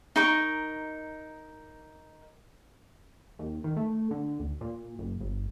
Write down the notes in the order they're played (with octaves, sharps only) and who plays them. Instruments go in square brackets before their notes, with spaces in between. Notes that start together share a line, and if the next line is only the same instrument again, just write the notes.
[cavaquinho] D#4 A#4 C#6
[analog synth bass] D#2
D#3
A3
D3
D2
A#2
F#1
G1